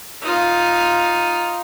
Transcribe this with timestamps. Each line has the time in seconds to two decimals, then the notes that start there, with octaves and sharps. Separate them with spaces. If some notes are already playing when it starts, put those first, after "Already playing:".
0.22 D#4 F4